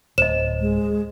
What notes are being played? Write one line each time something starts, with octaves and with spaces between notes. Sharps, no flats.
D1 C5 D#5 E7
G#3